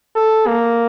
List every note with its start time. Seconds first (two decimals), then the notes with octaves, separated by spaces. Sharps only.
0.16 A4
0.47 A#3